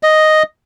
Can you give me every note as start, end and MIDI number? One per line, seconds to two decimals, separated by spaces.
0.03 0.43 75